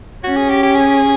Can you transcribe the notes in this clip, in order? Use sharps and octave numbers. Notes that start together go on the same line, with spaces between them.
C#4 F#4
G#4
G4
G4
G#4